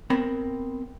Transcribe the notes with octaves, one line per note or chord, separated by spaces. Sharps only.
B3 C4 A#4 B5